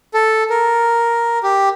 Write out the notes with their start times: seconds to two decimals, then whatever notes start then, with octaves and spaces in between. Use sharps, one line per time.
0.14 A4
0.50 A#4
1.43 G4